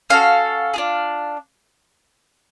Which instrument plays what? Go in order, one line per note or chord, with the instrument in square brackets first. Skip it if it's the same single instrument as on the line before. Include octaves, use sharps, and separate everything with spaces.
[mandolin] C#4 F#4 A4 F5
D4 F4 G#4